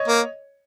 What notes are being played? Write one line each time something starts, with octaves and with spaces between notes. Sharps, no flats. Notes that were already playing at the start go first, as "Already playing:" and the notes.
Already playing: C#5 D#5
A#3